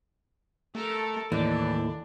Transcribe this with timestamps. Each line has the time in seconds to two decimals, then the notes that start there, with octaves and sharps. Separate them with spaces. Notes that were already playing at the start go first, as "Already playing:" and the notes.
0.75 A3 A4 A#4
1.32 D#2 A2 E3 D4